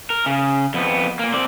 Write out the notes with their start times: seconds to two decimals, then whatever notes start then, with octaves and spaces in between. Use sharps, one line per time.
0.10 A#4
0.26 C#3
0.74 F2 B3
1.19 A#2 A#3
1.34 C4 D5